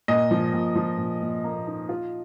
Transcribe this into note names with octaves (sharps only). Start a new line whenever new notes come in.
A#2 D#5
F3
A#2
F3
A#2
A#2
A#3
D#4
F4